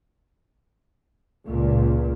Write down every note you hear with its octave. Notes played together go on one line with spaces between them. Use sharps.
C#2 A#2